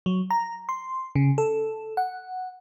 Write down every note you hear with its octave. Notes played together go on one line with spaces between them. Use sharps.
F#3
A#5
C6
C#3
A4
F#5